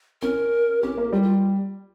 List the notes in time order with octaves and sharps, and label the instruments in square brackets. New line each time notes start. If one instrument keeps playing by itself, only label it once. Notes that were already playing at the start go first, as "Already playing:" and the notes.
[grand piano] C#4 [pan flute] A#4
[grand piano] C#4 [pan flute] G4
[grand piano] A#3
[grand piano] G3 [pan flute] F4
[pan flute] F4